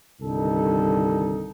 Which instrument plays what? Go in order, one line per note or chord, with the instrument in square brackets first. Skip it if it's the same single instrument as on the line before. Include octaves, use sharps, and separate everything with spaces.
[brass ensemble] C2 G2 D3 D#3 D#4 A4